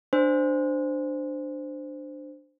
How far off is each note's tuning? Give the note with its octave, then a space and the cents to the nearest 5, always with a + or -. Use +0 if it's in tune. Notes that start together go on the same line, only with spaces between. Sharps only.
D4 +15 C5 -10